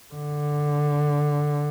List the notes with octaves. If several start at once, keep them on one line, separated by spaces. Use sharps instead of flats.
D3